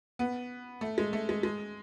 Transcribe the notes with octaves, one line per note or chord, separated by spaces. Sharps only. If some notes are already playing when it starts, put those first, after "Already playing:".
B3
A3
G#3
A3
G#3
G#3